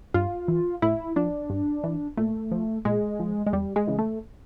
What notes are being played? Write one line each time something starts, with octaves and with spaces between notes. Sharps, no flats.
G2 F4
E3
A2 E4
F3 D4
G2
E3
A#2 A3
F3
A#2 G#3
F3
G#3
E2 G3
G#3
C#3 E3
A3